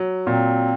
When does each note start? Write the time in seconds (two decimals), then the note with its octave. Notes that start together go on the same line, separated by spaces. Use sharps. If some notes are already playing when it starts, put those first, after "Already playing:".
Already playing: F#3
0.27 A#2 C4